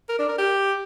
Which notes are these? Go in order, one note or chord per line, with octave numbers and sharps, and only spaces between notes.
A#4
D4
A#4
G4